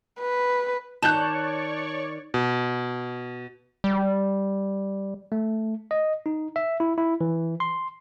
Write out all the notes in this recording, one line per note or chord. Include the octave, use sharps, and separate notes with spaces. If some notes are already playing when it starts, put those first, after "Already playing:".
B4
D#3 C#5 D5 A5 C#6 F#6 G6 E7
B2
G3
A3
D#5
D#4
E5
E4
E4
E3
C6